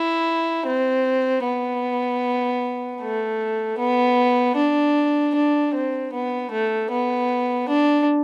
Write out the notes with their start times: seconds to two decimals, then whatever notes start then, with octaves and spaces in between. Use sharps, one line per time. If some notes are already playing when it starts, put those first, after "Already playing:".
Already playing: E4
0.66 C4
1.44 B3
3.01 A3
3.78 B3
4.56 D4
5.35 D4
5.74 C4
6.13 B3
6.51 A3
6.91 B3
7.69 D4